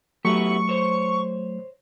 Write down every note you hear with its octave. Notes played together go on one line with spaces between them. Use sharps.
F#3 A3 B3 E4 G4 C#6
C5 C#5